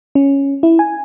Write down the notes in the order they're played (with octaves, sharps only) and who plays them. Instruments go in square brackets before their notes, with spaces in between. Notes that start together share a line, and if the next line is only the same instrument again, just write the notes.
[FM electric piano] C#4
E4
G#5